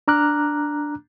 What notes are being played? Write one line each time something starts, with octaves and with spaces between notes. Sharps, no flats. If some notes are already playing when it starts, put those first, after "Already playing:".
D4 A#5 D6 F6 F#6